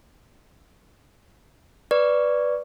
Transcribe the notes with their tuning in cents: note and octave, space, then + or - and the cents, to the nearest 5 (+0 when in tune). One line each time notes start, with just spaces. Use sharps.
B4 +0 D5 +0 C#6 +10